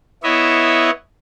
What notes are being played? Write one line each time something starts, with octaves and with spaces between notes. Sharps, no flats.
B3 E4 C#5 D#5 E5